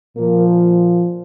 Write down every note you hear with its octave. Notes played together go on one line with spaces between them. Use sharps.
A#2 F3 A#3